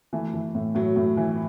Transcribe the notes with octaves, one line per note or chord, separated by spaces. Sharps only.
E3 A3
E3
A2
A2 F#3
A2
E3